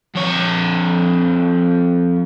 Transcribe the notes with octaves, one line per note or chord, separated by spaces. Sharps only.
F2 C#5